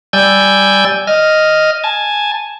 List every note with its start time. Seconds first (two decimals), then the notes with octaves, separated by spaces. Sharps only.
0.13 G3 D5 G#5 E6 G6
1.07 D#5 F6
1.84 G#5 A5